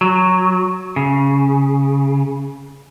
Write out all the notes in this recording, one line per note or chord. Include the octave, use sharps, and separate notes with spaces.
F#3
C#3